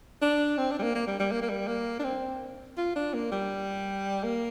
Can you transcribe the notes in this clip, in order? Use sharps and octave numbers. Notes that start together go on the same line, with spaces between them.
D4
C4
D4
G3
A#3
A#3
G3
G3
A#3
A#3
G3
A#3
D4
C4
F4
D4
A#3
G3
A#3